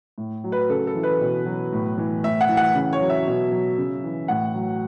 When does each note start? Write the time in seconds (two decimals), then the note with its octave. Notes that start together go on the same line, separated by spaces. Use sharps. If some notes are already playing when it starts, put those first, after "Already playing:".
0.18 A2
0.44 F#3
0.52 B4
0.70 C#3 A4
0.87 A4
0.95 E3
1.03 B4
1.21 B2
1.46 F#3
1.73 A2
1.98 E3
2.24 A2 E5
2.41 F#5
2.49 E3
2.57 F#5
2.75 C#3
2.93 C#5
3.00 F#3
3.10 E5
3.27 B2
3.52 F#3
3.78 C#3
4.04 E3
4.28 A2 F#5
4.54 F#3